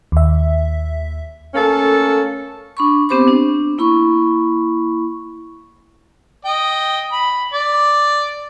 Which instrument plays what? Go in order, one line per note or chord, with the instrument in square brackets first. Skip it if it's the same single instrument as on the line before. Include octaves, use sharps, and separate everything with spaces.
[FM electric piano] D#2 E5
[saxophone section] A3 A#3 C#4 A4
[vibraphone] D4 B5 C#6
B3 C4 G4 C5 B5 D6
D4
A#3 E4 B5 C#6
[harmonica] D#5 G5
B5
D5